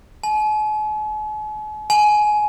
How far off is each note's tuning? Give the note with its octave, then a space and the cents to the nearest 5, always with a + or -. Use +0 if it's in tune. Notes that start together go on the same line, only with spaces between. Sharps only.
G#5 +45
G#5 +20